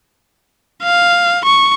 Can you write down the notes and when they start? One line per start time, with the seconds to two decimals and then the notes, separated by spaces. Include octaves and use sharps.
0.83 F5
1.45 C#6